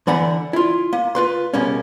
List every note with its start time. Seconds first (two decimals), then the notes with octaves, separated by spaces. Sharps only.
0.07 D3 E3 D5 F#5 A#5 B5
0.53 E4 F4
0.93 A#3
1.15 F4 B4 C6
1.54 C#2 B2 G3 A#3 C#4